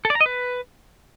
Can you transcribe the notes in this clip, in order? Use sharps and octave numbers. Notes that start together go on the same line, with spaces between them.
A4
D5
A#5
D#5
B4